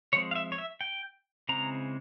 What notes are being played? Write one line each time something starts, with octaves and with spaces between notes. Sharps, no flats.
F3 G#3 C4 C#5
F5
E5
C#5
E5
G5
C#3 E3 G#3 C4 A#5